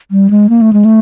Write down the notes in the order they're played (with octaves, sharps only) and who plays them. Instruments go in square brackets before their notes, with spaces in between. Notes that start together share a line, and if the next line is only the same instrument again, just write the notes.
[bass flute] G3
G#3
A#3
A3
G#3
A3